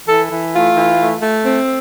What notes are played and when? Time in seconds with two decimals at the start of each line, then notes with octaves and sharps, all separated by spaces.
0.08 E3 A4
0.31 E3
0.54 A3 F4
0.76 E3
0.99 A3
1.21 A3
1.45 C4